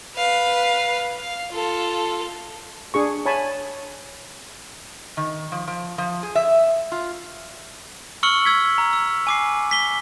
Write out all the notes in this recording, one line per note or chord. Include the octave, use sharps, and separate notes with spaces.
B4 F5
F5
F4 A4
D4 G#4 C#6
C#5 G#5 A5 B5
D#3
F3
F3
F3
G#4
E5
F4
C#6 E6 F6 C#7 F#7 G7
E6 G#6 B6
A#5
E6
G#5 D6 C7
B6 G7